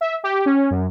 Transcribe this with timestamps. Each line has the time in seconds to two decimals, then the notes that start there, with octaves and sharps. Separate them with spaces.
0.01 E5
0.24 G4
0.46 C#4
0.71 F#2